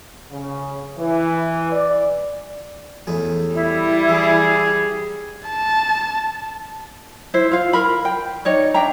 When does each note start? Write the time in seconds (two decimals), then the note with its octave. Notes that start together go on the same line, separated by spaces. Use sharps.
0.31 C#3
0.98 E3
1.72 D5
3.07 E2 A2 G#4
3.54 G3 E4
4.09 E3 G#4
5.48 A5
7.34 E4 C5
7.51 F4 F5
7.73 A#4 B5
8.05 G5
8.45 D#4 C#5 D5
8.74 D4 E5 G5 A#5